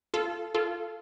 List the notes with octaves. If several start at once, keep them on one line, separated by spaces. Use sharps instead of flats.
F4 A4
F4 A4